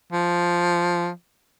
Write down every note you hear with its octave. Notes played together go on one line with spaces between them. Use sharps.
F3